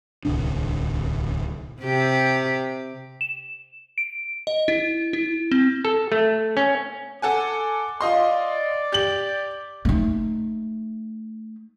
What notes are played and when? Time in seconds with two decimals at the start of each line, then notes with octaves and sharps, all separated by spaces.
0.25 D1 C2 D4
1.81 C3 G4
3.21 E7
3.98 D7
4.47 D#5
4.68 E4
5.13 E4
5.51 C4
5.85 A4
6.12 A3
6.57 C#4
7.22 A4 F#5 G#5 D6
8.01 F4 D5 D#5 C6
8.92 G4 F#7
9.85 A3 D#4